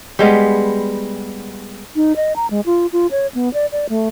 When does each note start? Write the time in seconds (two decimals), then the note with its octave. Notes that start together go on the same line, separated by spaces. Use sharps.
0.19 G3 G#3 B3
1.96 D#4
2.16 D#5
2.36 A#5
2.50 G#3
2.66 F4
2.93 F4
3.11 C#5
3.35 B3
3.54 D5
3.72 D5
3.89 A3